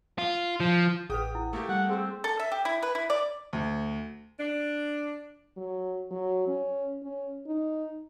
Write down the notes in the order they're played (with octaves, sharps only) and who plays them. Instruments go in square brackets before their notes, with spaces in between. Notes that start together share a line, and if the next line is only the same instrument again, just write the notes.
[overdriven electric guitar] F4
F3
[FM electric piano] A1 F#5 [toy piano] G#4 B4 [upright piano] G5 D#6
[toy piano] E4
[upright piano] A3 A#3 G4
[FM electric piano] G3 [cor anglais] F#5
[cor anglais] C4 [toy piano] G#4 E6
[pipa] A4
E5
G4
E4
B4
E4
D5
[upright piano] D2
[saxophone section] D4
[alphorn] F#3
F#3
C#4
C#4
D#4